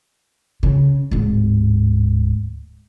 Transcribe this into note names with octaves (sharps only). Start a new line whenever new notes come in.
C#3
D1 G#2